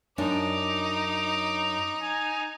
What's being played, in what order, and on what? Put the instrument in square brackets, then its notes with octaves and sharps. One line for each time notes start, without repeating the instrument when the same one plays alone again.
[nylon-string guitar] F#2 D4 [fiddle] D#4 [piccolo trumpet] D6
[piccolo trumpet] G#5